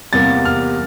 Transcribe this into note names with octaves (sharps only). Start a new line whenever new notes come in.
E2 C3 G3 A#3 A6
F6